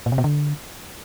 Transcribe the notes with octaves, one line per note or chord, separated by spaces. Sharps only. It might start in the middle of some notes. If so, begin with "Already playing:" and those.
A#2
C3
B2
D3